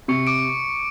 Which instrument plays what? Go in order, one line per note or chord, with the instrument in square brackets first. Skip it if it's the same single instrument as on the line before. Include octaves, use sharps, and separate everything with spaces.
[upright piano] C3 [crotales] C#6 C#7
[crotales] D6 D7